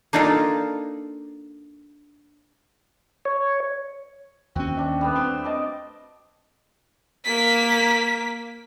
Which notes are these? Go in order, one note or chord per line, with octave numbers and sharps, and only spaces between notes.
A#3 D4 D#4 F4 A4
C#5
D#2 C4 C#4 F#4
C4 D4 E5
G3 A3 B3
C4 C5
D#5 A5 D6
A#3 B6